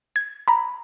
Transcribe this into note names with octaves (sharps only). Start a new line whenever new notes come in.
G#6
A#5 B5